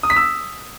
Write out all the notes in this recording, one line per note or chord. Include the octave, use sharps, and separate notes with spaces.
D#6
B6
E6